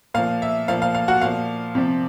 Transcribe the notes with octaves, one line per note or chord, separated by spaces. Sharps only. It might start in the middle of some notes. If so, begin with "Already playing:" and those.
A#2 F3 F5
E5
A#2 F3 F5
F5
F5
F#4 F#5
A#2 F3 F5
C3 F3